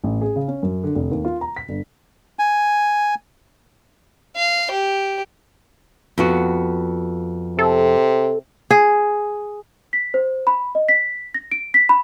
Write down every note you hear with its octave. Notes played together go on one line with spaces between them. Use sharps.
A1
G#4
C#3
C#4
F#2
D3
F1
D#2
F4
A#5
B6
G1
G#5
F5
G4
F2 B3 F#4
C3 A4
G#4
B6
C5
B5
D#5
B6
A#6
D7
B6
B5